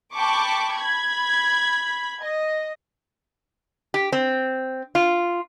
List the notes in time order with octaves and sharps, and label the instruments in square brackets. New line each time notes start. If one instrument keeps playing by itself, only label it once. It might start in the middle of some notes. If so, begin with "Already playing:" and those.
[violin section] G5 A5 B5 C#6 D6
B5 G#6
D#5
[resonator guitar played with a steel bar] G4
C4
F4